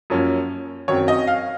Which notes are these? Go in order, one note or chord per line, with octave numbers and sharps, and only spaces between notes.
F#2 F3 A#3 C#4
F#2 D#3 F#3 C4 C#5
D#5
F5